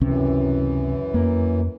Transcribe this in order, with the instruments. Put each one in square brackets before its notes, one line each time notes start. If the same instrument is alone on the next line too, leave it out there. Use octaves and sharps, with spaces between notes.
[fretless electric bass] C#2 C3 C#4 [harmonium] F#2 E3
[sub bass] F2 [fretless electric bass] A#3